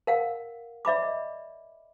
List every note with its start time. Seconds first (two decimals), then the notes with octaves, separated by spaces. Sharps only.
0.07 A#4 F5 F#5
0.85 D5 E5 B5 D6
1.02 D#5